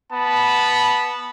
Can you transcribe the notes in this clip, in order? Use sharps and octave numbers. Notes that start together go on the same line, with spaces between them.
B3 A5 B5